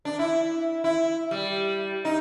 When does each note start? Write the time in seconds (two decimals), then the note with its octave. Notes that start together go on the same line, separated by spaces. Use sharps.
0.05 D4
0.19 E4
0.84 E4
1.31 G3
2.05 D#4